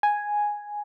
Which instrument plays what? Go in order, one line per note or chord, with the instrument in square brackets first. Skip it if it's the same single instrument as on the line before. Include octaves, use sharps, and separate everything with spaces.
[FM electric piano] G#5